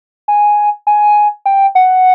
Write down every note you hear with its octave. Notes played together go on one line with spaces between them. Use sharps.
G#5
G#5
G5
F#5